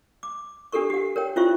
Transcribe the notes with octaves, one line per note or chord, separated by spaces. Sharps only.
D6
D4 G4 A4 A#4 C#6
G4 F#5
A#4 C#5 G5
C#4 E4 F4 C5 E5 C#6